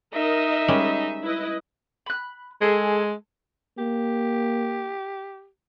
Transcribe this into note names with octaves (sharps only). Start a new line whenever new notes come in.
D#4 A#4 D#5 E5
G3 G#3 C#4
E4 B4 D#5
B5 F#6
G#3 G#4 A4
A#3 G4